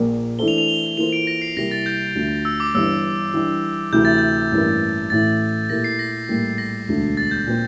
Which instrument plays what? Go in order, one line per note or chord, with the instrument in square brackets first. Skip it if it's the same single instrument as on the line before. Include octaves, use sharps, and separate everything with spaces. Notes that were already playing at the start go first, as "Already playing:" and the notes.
Already playing: [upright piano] A#1 A#2 F3 A#3
[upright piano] E3 A3 D4 A4 C5 [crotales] G7
[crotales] F7
F7
G7
[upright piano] E3 A#3 F4 A4 C5 [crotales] F7
[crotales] D7
A#6
C7
[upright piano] C2 C3 G3 A#3 E4 [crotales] A#6
[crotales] A6
G6
[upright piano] D2 D3 F3
[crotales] E6
D6
[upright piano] G1 G2 E3 [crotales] E6
[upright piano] E3 G3 D4
[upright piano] D2 C3 E3 [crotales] G6
[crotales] A6
G6
[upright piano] A1 G2 E3 A#3
[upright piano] A1 A2 E3 [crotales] A6
[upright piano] A#2 A3 E4 G4 A#4 [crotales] A#6
[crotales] C7
A#6
[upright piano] A#1 A2 G3 A#3
[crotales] A#6
[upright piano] E1 D2 D3
[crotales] A6
G6
[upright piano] A#2 F3 C4